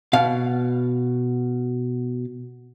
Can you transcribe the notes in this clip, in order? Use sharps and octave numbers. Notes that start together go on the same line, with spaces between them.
B2 F5